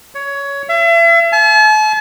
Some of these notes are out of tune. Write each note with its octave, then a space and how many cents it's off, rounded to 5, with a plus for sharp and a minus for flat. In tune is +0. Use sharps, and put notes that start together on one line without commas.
C#5 +15
E5 +40
A5 -45